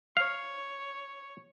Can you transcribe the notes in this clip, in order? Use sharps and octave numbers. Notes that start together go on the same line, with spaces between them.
C#5 F5